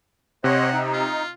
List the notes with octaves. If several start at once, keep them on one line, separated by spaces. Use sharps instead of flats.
C3 C5 C#5 D#5 F#5
D#4
F4